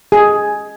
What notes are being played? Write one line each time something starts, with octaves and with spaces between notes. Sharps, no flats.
G#4